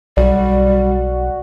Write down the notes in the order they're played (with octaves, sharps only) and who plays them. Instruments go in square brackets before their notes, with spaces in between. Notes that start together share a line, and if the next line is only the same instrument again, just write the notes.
[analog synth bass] B1 [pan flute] G3 [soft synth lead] F#4 [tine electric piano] D5